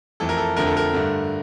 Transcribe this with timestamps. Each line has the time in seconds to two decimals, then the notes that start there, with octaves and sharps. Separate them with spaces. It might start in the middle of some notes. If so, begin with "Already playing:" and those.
0.20 F2 E3 A3 A4
0.29 A#4
0.38 A4
0.57 F2 D3 A3 A#4
0.67 A4
0.77 A#4
0.93 G2 D3 A3